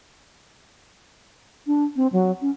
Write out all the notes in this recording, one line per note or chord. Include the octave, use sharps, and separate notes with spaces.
D4
C4
F#3
C#4